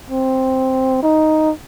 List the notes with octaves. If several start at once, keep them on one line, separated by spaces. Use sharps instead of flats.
C4
D#4